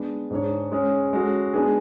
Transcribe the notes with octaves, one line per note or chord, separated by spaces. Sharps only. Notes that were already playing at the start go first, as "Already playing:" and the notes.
Already playing: G#3 B3 D4
G#2 G#3 D4 G#4 C#5
G#3 C#4 G#4 C#5
G#3 C#4 F#4 A4
G#3 B3 D4 G#4